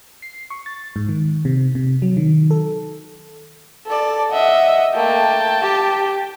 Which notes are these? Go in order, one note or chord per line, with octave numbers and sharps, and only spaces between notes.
C7
C#6
A6
G#2
D#3
C3
C3
F#3
D#3
A4
A4 D5
D#5 E5 F#5
A3 A#3 G5 A5
G4